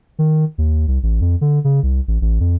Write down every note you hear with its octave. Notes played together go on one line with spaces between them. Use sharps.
D#3
D#2
C2
A1
F2
D3
C#3
C2
A1
A1
F2